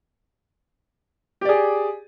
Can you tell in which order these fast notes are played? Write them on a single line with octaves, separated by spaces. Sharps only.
G4 D5 G#4